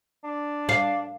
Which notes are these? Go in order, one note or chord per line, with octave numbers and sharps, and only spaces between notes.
D4
F5